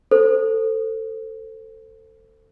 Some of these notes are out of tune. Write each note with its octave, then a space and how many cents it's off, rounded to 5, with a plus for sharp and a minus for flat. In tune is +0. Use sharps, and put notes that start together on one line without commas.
A4 +20 C5 -5